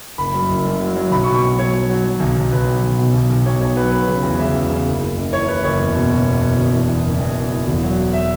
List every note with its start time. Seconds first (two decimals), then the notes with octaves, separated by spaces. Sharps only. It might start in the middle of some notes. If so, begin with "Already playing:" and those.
0.18 F#1 B5
0.34 F#2
0.49 F#1
0.65 F#2
0.80 F#3
0.96 F#3
1.11 B1 B5
1.23 C#6
1.27 B2
1.35 C#6
1.43 F#3
1.59 F#3 C#5
1.73 F#3
1.90 F#3
2.05 F#3
2.20 B1
2.36 B1
2.52 B1 B4
2.67 F#3
2.83 B1
2.99 B2
3.14 B1
3.30 B1
3.45 B2 C#5
3.61 B1 C#5
3.76 F#3 B4
3.92 F#3 B4
4.08 C#3
4.23 E2
4.39 C#3 E5
4.55 E2
4.70 C#3
4.86 F#1
5.01 F#1
5.17 F#1
5.33 E3 C#5
5.48 E3 B4
5.64 F#1 C#5
5.80 E2
5.95 B2
6.11 B2
6.26 E2
6.41 B2
6.58 E1
6.73 E3
6.89 E2
7.04 F#1
7.20 E2
7.36 F#1
7.51 E3
7.67 E1
7.82 F#3
7.98 F#3
8.13 E5